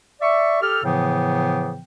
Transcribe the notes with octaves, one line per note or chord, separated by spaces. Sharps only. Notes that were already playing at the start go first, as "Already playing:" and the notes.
D5 E5 C#6
G4 A4 F6
A2 C#3 E3 F3 B3 G5